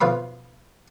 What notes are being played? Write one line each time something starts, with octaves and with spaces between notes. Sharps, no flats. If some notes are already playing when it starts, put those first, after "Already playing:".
B1 F3 F4 B4 E5 B5